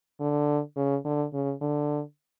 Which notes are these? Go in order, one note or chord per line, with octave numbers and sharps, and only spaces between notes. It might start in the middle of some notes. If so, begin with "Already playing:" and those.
D3
C#3
D3
C#3
D3